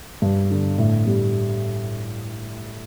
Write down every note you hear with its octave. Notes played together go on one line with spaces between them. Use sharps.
G2
D3
A2
G3